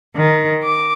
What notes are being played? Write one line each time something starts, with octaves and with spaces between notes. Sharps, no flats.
D#3
D6